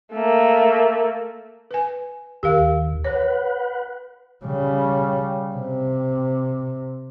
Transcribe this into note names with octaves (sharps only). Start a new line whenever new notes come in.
A3 A#3
B4 G#5
D#2 G4 A#4 F5
B4 C#5 F#5
C#3 G3
C3